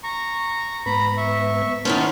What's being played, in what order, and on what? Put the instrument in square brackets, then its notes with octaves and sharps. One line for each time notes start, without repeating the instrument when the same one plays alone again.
[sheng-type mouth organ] A#5 C#6
[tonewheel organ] G#2 B3 [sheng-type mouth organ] A#5 B5
[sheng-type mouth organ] E5 C#6
[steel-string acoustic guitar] D#3 B3 C#4 [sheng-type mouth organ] C5 A5 [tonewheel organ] F6